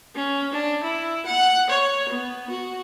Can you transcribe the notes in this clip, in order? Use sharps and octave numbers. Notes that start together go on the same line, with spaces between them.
C#4
D4
E4
F#5
C#5
B3
F#4